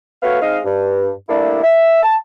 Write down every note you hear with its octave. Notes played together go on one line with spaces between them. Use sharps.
A3 B3 F#4 B4 C#5 F5
G#3 C4 D#4 D#5 F5
G2
G3 A3 A#3 D4 E4
E5
A5